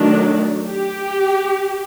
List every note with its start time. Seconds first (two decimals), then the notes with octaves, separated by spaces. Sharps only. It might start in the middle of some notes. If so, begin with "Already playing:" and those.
Already playing: D#3 F#3 A3 D4
0.68 G4